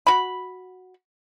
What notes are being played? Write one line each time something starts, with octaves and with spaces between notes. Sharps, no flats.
F#4 B5